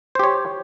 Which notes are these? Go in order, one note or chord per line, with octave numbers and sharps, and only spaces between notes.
G4 C5 C#5